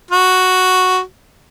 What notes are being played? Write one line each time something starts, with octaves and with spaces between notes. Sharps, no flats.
F#4